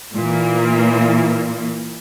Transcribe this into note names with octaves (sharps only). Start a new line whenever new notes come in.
A#2 E3 A#3